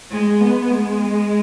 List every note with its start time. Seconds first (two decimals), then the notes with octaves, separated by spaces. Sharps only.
0.11 G#3
0.41 B3
0.70 G#3